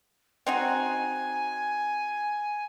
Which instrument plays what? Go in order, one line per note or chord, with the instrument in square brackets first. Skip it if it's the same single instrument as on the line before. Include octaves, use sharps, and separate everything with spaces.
[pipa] C4 D#4 F#4 [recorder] G#5